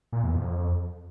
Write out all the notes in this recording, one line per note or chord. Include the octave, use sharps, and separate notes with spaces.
A#2
E2
F2